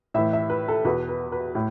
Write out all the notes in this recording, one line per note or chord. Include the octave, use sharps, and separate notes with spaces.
A2 E3 E5
E5
B4
A4
E2 B2 B4
B4
B4
A2